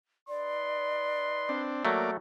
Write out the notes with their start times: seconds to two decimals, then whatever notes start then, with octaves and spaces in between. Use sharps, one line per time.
0.28 D#4 B4 D5 C6
1.49 C4 D4
1.85 F#3 A3 A#3 D5